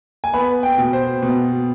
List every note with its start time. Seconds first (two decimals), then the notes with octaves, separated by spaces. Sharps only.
0.24 G#5
0.34 B3 B5
0.63 G5
0.78 B2
0.93 C5
1.22 B2